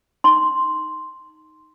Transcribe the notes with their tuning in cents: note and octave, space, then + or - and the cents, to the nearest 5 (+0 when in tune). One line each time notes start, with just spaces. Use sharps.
D#4 +0 C6 +0